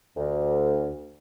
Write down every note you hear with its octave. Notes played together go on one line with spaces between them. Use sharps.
D2